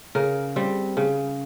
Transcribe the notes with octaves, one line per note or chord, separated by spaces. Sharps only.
C#3 A#4
G3 C4
C#3